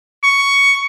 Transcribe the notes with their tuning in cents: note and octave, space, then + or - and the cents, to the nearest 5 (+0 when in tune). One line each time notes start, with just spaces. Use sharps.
C#6 +10